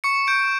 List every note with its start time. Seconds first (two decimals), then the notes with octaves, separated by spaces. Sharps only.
0.04 C#6 C#7
0.27 G6 D7